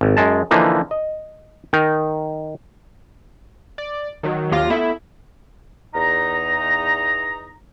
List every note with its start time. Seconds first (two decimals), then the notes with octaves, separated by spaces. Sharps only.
0.01 G#1
0.17 F#2 G#3 A5
0.51 D3 E3 F3 A#3 D#4
0.91 D#5
1.73 D#3 D#4 A#4
3.78 D5
4.23 D#3 F#3
4.52 D#2 F#3 F4 G4 F5 A#6
4.70 B3 E4 A4 E5
5.95 E2 D#4 A#5